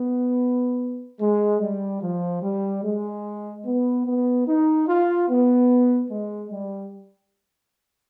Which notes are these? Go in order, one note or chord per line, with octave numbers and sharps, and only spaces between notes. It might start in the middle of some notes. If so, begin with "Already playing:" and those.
Already playing: B3
G#3
G3
F3
G3
G#3
B3
B3
D#4
F4
B3
G#3
G3